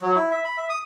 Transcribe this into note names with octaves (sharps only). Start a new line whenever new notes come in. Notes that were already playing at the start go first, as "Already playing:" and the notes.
F#3
E4
E5
B5
E5
D#6